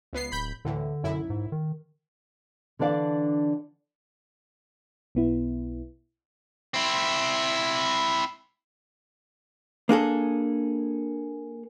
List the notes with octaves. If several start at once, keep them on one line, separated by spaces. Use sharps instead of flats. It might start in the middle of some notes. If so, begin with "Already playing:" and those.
C#2 B3 C7
D1 B5 G6
D2 A2 D3 E3
B1 F#2 E4
G#2
D#3
D3 E3 D4 D5 F5
B1 B3 E4
C4 E4
A#3 D4 G#4 A4